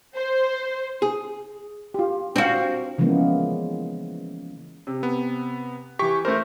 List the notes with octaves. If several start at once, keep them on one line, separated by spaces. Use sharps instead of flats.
C5
G#4
F4 G4
C4 D4 F#4 F5
C#3 E3 F3 G#3 A#3 B3
C3
B3
E3 G4 C#6 B6
A3 A#4 C5